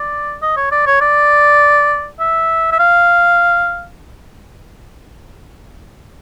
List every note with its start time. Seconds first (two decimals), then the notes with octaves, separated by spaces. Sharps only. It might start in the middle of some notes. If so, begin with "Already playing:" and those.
Already playing: D5
0.43 D#5
0.57 C#5
0.72 D5
0.87 C#5
1.01 D5
2.20 E5
2.72 E5
2.79 F5